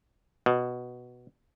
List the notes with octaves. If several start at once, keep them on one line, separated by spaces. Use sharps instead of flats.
B2